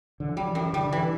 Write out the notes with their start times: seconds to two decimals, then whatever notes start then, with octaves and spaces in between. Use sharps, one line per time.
0.20 D3
0.29 E3
0.36 F#3 G3
0.48 E3
0.55 F#2
0.61 E3
0.73 D3 G3
0.85 D3
0.92 E3
0.98 D3